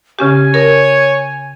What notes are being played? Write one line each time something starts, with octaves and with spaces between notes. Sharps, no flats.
C#3 C#4 G4 G#5
A#4 C#5